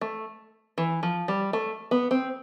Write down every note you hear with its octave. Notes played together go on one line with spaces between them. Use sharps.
A3
E3
F3
G3
A3
B3
C4